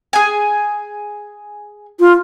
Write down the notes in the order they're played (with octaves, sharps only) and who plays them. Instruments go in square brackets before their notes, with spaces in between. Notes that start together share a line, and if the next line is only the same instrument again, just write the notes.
[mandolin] G#4 G#5
[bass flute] F4